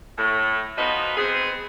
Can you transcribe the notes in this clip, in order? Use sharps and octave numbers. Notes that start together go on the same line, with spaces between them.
A2
F3 B3 D#4 F#4 B4
B3 C4 G#4